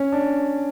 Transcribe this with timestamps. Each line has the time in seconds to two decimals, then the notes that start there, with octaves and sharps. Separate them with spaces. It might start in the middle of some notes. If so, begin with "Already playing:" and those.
Already playing: C#4
0.13 D4